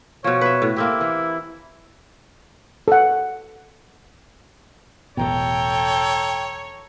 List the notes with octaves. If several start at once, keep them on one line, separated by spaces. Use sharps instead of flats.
B2 F3 C#5
B4 E5
A2
A#3 C4 E4 G4
E3
A4 F#5
E1 A1 B2 A4 C#5 G5 A#5